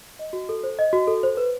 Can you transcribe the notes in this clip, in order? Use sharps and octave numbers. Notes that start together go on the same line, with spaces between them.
D#5
F#4
A4
C5
D#5
F#4
A4
C5
B4